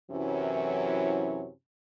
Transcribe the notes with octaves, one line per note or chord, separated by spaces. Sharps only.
F#2 C3 E3 F#3 C#4 E4